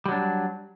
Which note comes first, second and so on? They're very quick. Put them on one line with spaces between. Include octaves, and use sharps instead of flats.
G3 F#3 D4